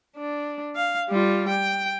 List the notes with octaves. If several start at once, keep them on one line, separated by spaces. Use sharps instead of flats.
D4
F5
G3 F4
G5